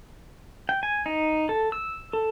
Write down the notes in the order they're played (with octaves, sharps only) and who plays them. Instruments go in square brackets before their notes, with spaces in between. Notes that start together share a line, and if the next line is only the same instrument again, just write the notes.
[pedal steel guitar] G5
G#5
D#4
A4
E6
A4